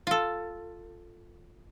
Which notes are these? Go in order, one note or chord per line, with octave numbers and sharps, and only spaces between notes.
F4 A4